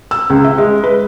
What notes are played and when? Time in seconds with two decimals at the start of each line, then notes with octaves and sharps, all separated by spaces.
0.11 E6
0.30 C#2
0.44 E5
0.58 G#3
0.84 B4